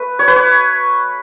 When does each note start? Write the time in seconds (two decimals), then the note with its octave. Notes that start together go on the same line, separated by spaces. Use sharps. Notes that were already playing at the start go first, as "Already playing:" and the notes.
Already playing: A3 B4
0.19 C#5
0.28 B4
0.36 C#5